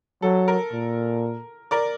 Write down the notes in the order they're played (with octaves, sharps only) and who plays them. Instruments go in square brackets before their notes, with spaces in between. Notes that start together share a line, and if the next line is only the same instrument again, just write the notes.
[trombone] F#3 [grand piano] A4
[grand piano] A#4
[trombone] A#2
[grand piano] A#4 D5